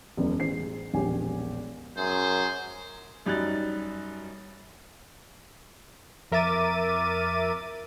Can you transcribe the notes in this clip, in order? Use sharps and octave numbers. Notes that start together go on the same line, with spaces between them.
E1 F#2 B2 E3
A1 G#4 C5 C7
E1 A#1 C#4 G4 G#5
F#2 G#4 C5
F#2 G3 D#4 B5 F#6 A6
F2 A#4 E5 D6 A6 D#7